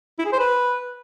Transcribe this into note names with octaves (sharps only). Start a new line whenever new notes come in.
E4
G#4
C5
B4